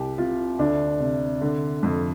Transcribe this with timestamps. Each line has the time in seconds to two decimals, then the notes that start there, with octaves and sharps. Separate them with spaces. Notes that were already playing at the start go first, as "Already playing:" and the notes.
Already playing: C2 G4
0.18 C3 F4
0.59 D2 D4
1.00 C3
1.41 D3
1.83 F2